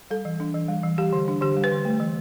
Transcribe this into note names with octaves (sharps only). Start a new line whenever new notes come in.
G3 A4
E3
D4
E3
G3
E3
G3 G4
D3
D4
D3 G4
G3
B4
D3
A3
E3